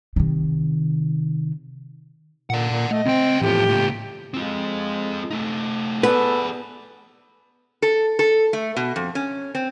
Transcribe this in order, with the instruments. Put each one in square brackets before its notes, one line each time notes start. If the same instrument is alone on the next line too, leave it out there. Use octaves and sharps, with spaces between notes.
[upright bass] C3 D#3
[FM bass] A#2 [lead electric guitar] D5 F#5
[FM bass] A#2
[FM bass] A3 [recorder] D#5
[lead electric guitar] C#2 G5 [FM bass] C4
[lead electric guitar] E2 F3 [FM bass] A2 [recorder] G4
[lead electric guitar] C#2 A#2
[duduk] G#3 [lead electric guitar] C4 F4
[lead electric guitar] A3 D#4
[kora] B3 [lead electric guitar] G#4 D5 [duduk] A4 [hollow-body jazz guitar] B4
[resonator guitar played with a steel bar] A4
A4
A3
B2
F2
C#4
C4